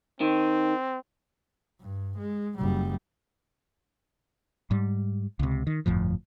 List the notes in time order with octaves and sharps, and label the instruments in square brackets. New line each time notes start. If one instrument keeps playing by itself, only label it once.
[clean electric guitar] D#3 [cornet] C4
[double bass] G2
G#3
F#1 G3
[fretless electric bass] G#2 G3
C#2 C3
D#3
G1 F2 A2 F3